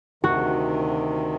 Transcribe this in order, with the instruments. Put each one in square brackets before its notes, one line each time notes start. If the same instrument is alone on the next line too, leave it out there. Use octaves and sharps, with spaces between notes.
[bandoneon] D2 C3 D#3 [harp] F#4